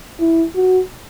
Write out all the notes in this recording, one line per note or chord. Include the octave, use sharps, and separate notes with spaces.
E4
F#4